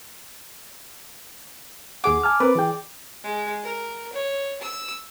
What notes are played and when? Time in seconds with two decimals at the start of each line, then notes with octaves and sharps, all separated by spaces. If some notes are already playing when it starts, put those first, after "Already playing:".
2.04 D#2 G#4 F#5 D6
2.23 G#5 A5 F6
2.40 C4 A#4 B4 D5
2.55 E3 G#4 G5
3.24 G#3
3.63 A#4
4.13 C#5
4.61 E6